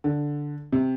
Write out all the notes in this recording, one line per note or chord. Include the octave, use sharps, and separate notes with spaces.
D3
C3